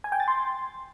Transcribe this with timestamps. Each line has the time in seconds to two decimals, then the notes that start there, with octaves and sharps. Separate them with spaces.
0.04 G#5
0.12 G5
0.20 A6
0.28 C6